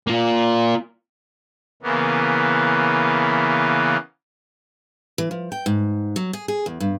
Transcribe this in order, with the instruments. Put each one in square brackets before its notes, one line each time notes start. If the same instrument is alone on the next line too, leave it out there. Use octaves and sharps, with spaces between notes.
[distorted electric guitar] A#3 F4
[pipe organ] C#3 E3 A#3 B3
[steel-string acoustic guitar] E3
F3
G5
G#2
F#3
G#4
G#4
E2
G2